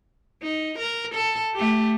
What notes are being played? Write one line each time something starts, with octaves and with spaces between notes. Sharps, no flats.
D#4
A#4
A4
A3 G4